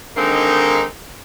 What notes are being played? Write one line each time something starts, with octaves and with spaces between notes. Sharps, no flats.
D3 D#3 G#3 A#3 C4 D#4